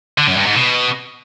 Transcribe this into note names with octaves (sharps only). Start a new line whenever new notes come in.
D3
F#2
G2
G#2
B2